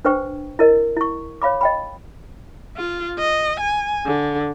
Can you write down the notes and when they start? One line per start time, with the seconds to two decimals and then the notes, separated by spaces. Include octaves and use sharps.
0.05 D4 B4 C5 G5 C#6
0.59 E4 A#4 D#5
0.97 E4 C#6
1.42 C#5 F5 B5 D6
1.61 D#5 G5 B5
2.77 F4
3.19 D#5
3.60 G#5
4.06 D3